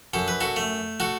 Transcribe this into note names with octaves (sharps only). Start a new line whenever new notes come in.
F#2 A4
B4
F#4 A4
A3
F#4 A4